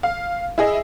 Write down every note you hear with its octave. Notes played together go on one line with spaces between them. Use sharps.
F5
E4 G#4 D#5